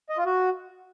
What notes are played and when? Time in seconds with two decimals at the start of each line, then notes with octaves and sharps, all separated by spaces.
0.10 D#5
0.18 F4
0.26 F#4